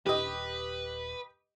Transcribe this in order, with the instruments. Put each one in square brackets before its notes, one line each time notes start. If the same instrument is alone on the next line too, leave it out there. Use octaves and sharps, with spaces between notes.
[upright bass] D#1 [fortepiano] G4 D#5 [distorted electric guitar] B4